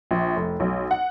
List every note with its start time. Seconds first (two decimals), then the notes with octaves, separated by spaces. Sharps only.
0.11 A#1
0.36 F1
0.60 B1
0.91 F#5